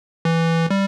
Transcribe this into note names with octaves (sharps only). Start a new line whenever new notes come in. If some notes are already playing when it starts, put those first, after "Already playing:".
E3
G3